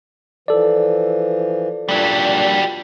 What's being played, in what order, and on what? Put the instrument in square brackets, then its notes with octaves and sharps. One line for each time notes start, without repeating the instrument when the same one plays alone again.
[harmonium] E3 F3 [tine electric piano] A4 D5
[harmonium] A#2 A#3 D4 [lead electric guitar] F#3 G3